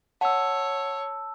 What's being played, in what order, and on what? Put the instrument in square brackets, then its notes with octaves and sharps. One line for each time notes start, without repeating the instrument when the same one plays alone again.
[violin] C#5 [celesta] F#5 [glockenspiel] A5 E6